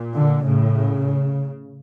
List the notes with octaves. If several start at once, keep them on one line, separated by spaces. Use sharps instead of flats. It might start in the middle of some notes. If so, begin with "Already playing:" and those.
Already playing: A#2
D3
A2 C#3